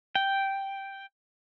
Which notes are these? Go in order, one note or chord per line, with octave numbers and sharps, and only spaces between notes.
G5